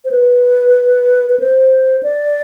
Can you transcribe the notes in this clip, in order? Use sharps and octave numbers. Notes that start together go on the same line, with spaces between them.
C5
B4
B4
C5
D5